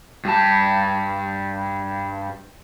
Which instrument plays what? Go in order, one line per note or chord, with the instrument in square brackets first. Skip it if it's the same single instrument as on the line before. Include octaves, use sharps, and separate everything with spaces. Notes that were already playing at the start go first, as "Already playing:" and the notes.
[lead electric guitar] G2 A5